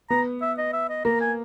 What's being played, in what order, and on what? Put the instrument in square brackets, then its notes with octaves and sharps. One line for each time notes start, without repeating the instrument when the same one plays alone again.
[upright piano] B3 [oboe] A#5
[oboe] E5
D#5
E5
D#5
[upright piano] A#3 [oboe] A#5
[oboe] G#5